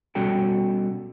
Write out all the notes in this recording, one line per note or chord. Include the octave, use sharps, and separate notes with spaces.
B2 G3 C#4 F#4 A4 G5